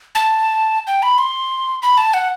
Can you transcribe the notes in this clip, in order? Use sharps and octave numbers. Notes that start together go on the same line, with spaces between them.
A5
G5
B5
C6
B5
A5
F#5